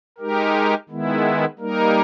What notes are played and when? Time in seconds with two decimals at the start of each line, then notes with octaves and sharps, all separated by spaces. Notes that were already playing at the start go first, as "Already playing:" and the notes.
0.18 G#3 D#4 G4 A#4
0.89 D#3 G#3 B3 E4
1.59 G3 A#3 D#4 A#4